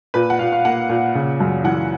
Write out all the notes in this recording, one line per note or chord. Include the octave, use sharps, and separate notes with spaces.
A#2 B4
F#5
A#2 F5
F5
A#3 F#5
A#2
C#3
F#2
E3 F#5